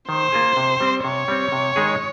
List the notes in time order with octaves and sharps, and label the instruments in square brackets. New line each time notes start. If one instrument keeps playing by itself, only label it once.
[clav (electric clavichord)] D#3 [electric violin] C5
[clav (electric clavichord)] A#3 F4 G#4
C3
G3 C4
[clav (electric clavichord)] C3 [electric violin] C#5
[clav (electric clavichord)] G3 C4
C3
D#3 G#3 D#4 G#4